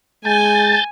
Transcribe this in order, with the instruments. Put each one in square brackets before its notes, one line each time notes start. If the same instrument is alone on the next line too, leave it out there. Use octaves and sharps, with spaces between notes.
[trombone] G#3 [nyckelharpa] G#5 [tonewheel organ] A5 G6 A6